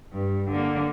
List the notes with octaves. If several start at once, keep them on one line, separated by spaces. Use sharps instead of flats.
G2
D3 A#3